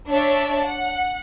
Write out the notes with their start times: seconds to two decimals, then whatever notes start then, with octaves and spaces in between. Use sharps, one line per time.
0.10 D4 C#5 D5 E5 A5
0.63 F#5